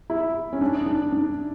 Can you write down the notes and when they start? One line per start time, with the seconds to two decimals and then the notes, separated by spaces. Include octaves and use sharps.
0.10 E4
0.53 C#4
0.61 D4
0.86 D4
1.12 D4